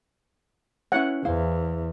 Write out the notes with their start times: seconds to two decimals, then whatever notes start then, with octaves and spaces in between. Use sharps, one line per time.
0.92 C#4 E4 C#5 F#5
1.25 E2 E4 C5 F5